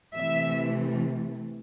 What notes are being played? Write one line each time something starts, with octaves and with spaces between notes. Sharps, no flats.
C3 E3 A3 E5